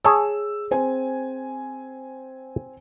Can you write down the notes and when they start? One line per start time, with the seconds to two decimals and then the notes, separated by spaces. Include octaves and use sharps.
0.05 G#4 C#5 A5 E6
0.71 C4 C5 G#5